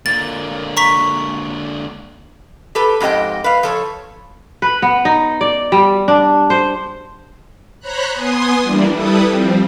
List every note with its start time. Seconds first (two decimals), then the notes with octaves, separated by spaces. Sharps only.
0.06 D3 A#3 A6
0.77 A#5 C#6 B6
2.75 G4 A4 B4
3.00 F2 G#2 G4 D#5 G5
3.44 B4 F5
3.63 F3 A4 C#5
4.62 B4
4.82 B3
5.05 D#4
5.41 D5
5.72 G3
6.08 D4
6.50 C5
7.79 C5 C#5 A#5 B5 F#6
8.12 B3 G#5 C6 D#6
8.61 E3 G3 A#3 D4 E4
8.93 G3 E4 A4 B4 D#6
9.27 F3 G3 C4